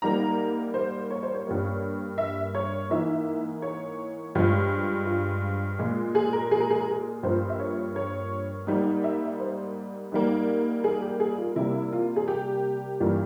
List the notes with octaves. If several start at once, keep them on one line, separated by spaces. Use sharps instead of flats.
G#2 G3 A#3 A#5
C5
C#5
C5
C#5
G2 G3 A#3
E5
C#5
G#2 E3 A#3 E5
C#5
G2 F3 G#3
F4
A#2 G#3 F4
G#4
A#4
G#4
A#4
G#4
A#4
G#4
G2 F3 A#3 C5
E5
C#5
C#5
G#2 G3 A#3
E5
C5
G#2 G3 A#3
G#4
G4
G#4
F4
C3 G3 A#3 E4
F4
G#4
G4
G2 E3 G3 A#3